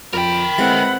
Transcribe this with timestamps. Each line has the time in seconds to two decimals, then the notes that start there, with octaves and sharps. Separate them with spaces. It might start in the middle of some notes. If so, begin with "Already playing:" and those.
0.13 F2 A#4 G5 B5
0.58 E3 G#3 C4 F#5